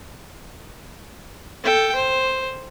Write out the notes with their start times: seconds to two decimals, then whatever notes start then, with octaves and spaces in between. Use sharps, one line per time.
1.63 A4 G5
1.95 C5